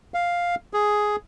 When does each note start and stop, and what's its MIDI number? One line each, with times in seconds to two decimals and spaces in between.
0.14 0.55 77
0.74 1.16 68